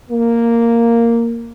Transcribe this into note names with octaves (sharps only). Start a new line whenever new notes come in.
A#3